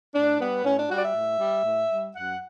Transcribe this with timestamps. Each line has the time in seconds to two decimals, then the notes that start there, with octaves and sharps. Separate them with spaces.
0.14 A2 D4
0.40 G3 B3
0.64 A2 C#4
0.77 D4
0.89 G3 F#4
0.98 D5
1.03 E5
1.15 A2
1.39 G3
1.65 A2
1.90 G3
2.15 F#2 F#5